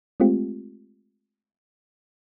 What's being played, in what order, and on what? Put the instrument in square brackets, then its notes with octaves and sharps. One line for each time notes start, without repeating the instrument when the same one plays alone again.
[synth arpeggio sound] G#3 A3 C4 F4 G4